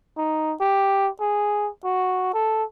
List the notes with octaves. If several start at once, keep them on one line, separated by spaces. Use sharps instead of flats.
D#4
G4
G#4
F#4
A4